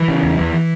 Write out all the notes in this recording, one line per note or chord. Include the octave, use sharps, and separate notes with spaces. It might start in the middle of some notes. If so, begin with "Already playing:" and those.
Already playing: E3
C#3
E2
E2